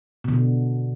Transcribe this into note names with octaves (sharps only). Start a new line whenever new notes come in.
B2 D3